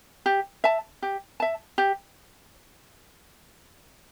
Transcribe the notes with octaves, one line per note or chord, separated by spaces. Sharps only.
G4
E5 A5
G4
E5 A5
G4